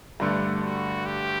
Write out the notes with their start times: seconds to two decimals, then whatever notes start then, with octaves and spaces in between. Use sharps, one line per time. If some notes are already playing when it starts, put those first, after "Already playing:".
0.20 G2 D3 A3 D4
0.63 F#4
1.06 G4